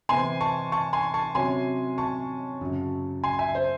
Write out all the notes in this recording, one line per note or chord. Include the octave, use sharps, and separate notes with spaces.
C3 E3 C4 G#5 C6
A5 C#6
A5 C#6
G#5 C6
A5 C#6
C3 F#3 C#4 G#5 C6
A5 C#6
F#2 C#3 F#3
G#5 C6
E5 G#5
C5